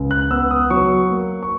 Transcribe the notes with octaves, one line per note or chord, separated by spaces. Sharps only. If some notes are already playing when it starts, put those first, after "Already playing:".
Already playing: C#2 G#3
F#6
B3 E6
D#6
F#3 C#6
A#3
C#6